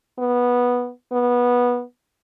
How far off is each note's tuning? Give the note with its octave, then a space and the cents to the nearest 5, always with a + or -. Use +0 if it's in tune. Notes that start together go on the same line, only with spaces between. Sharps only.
B3 -10
B3 -15